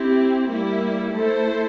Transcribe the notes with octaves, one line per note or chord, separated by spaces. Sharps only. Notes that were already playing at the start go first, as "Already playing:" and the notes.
Already playing: C4 E4 G4
G3 A#3 E4
A3 E4 A4 C5